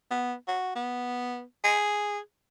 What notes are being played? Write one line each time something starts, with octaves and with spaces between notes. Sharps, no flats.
B3
F#4
B3
G#4